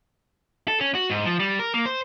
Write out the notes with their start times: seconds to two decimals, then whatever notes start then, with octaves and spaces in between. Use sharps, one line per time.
0.68 A4
0.81 C#4
0.95 F#4
1.10 G#2
1.25 F3
1.40 G3
1.59 A#4
1.74 A#3
1.86 C5